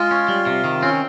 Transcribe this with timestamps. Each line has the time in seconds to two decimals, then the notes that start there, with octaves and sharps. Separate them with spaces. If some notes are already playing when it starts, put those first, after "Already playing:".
Already playing: G#3 F4
0.11 C#4
0.28 G3
0.47 C3
0.64 D#3
0.82 C4 C#4